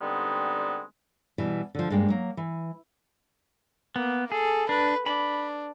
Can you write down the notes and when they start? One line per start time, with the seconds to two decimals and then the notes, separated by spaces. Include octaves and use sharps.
0.01 D3 G3 G#3 B3 C4 D#4
1.38 B2 E3 G3
1.75 D3 F3
1.90 G2 G#3 A#3 D4 G5
2.09 F#3 A#3
2.37 E3
3.96 A#3 B3
4.32 G#4 A4
4.69 D4 B4
5.06 D4 B5